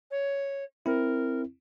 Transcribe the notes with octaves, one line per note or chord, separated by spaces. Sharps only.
C#5
C4 E4 A#4